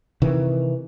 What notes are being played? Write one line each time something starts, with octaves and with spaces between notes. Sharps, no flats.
C3 D#3 E3